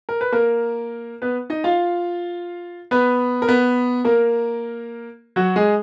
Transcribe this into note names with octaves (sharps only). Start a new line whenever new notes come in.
A#4
B4
A#3 A#4
B3 B4
D#4 D#5
F4 F5
B3 B4
A#4
B3 B4
A#3 A#4
F#3 F#4
G#3 G#4